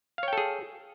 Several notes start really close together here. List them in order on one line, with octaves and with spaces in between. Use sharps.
F5 C#5 G5 A4 G#4